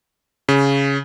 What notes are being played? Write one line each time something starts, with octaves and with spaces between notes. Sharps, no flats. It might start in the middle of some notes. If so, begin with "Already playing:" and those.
C#3